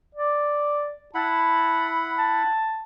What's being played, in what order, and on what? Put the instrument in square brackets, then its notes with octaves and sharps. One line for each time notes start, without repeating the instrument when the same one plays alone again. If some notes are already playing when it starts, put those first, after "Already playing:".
[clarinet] D5
[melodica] E4 F#5 B5 [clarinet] A5
[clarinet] A5